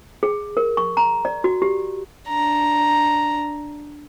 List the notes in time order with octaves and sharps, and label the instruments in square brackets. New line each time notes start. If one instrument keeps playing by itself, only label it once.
[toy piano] G#4
A#4
C#6
A#5
D5
F#4
G4
[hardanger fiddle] D4 A#5